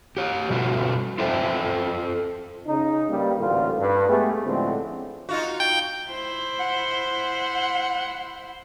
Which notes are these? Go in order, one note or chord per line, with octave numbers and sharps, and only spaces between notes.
G4 C#5
B2 G3 F4 F#4
F4 A4 C5 E5 G5
C#3 D#4
G2 G3 A#3
A1 D2 A#2 D3 G3 F4
G2 B4
G#3 A3 B3 G4 G#4
A2 D3 F3 G#3 C4 C#4
D#4 F4 F#4
G5
E4 C5
F#5